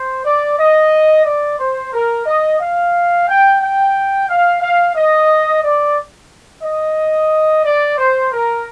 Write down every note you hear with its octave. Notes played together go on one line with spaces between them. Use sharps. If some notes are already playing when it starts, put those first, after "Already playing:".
Already playing: C5
D5
D#5
D5
C5
A#4
D#5
F5
G5
G5
F5
F5
D#5
D5
D#5
D5
C5
A#4